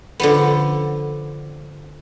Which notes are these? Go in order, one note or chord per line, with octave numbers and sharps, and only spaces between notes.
D3 F3 B3